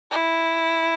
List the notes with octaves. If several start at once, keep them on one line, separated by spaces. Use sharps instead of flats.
E4